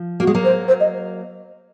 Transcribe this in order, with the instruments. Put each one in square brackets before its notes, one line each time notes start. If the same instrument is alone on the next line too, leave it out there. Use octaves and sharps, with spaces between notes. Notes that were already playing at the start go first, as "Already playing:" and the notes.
Already playing: [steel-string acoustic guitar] F3
[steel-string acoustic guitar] A#3 [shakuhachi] F#4
[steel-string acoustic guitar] G#3
F#3 A#3
[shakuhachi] C5
C5
D#5